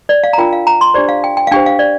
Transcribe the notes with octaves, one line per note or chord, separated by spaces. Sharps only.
D5
F5
A#5
D4 F4 A#4 G5
F5
A#5
C6
D4 G4 C5 D5
F5
G5
G5
F5
D4 G4 C5 G5
F5
D5